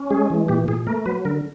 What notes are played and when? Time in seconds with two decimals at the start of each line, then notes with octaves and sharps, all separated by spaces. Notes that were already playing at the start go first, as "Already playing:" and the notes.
Already playing: C#4
0.10 G#3 G#4
0.30 E3
0.48 A#2 G4
0.68 A#2 G#4
0.87 A3 A#4
1.06 F#3 B4
1.25 D3 A#4